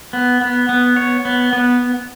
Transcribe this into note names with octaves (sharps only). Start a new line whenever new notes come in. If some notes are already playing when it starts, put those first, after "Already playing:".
B3
B3
B3
C#5
B3
B3